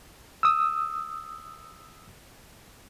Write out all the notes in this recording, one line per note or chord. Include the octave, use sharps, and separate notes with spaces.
D#6 E6